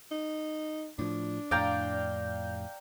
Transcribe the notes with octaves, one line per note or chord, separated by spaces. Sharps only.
D#4
A2 F3 D4
F2 A2 D5 F5 G5 A#5